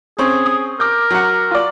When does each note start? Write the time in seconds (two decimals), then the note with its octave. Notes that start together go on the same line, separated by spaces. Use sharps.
0.19 C4 C#4 G#4
0.46 D#6
0.80 A#4 D6 G6
1.11 F#3 F#5
1.51 F4 D5